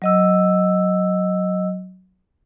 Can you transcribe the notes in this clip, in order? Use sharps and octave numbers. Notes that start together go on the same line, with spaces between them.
F#3 D#5 E6